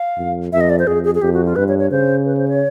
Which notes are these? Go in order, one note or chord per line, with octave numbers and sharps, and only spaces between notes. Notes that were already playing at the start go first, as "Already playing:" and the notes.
Already playing: F5
F2
F2 E5
D#5
D5
C5
F2 G#4
G#4
G#4
F2 G4
F#4
F4
G2 B4
C#5
C#5
C#3 C5
B4
C5
C#5